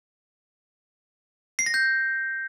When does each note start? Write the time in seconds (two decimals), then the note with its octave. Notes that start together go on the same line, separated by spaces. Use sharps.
1.59 C7
1.66 A#6
1.74 G6